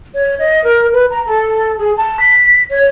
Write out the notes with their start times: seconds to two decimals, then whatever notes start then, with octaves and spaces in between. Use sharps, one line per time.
0.14 C#5
0.39 D#5
0.64 A#4
0.93 B4
1.10 A#5
1.26 A4
1.79 G#4
1.97 A5
2.20 B6
2.70 C#5